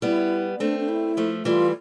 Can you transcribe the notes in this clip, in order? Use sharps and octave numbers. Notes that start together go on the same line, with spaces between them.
G3 B3 E4
A3 C4 D4
D4
E4
F3 A3
E3 G3 F4